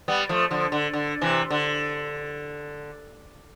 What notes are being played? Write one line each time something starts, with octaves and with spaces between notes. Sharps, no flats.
G3 B3
F3 A3
D3 F3
D3
D3
C3 E3
D3